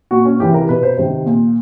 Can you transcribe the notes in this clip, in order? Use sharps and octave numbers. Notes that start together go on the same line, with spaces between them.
A#2 F#4
C#4
C3 E3 G4
A#4
B2 B4
C5
C3 D#3 C5
A#2